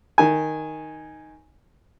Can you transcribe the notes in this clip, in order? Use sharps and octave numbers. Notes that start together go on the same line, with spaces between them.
D#3 G#5